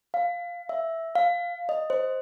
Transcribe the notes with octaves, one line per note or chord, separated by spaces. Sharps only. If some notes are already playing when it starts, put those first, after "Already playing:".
F5
E5
F5
D#5
C5